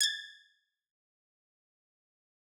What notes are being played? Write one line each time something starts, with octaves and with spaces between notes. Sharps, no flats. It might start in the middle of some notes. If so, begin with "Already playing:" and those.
G#6 A6